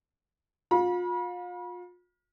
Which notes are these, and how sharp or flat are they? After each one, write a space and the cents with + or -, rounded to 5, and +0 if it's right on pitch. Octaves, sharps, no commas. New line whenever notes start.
F4 +35 B5 -35